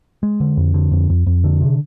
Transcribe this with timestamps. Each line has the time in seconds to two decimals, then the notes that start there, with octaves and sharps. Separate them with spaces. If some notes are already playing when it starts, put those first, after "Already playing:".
0.23 G#3
0.40 D3
0.57 F2
0.74 D3
0.92 F2
1.10 F2
1.27 F2
1.44 D3
1.61 C3